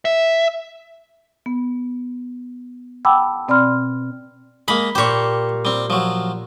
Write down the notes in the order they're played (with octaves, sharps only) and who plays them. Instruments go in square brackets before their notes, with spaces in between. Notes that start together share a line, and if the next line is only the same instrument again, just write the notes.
[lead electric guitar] E5
[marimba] B3
F#5 G5 A5 B5 D6 E6
B2 C4 D5 B5 C6 F6
[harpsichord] G#3 A#3 [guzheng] B5
[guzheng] A#2 G4 [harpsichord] C5 C#6
[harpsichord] G3 C4
F3 F#3